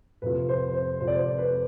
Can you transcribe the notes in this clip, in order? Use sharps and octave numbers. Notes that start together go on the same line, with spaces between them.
F2 C3 F3 B4
C5
C5
F2 C3 F3 C5
D5
C5
B4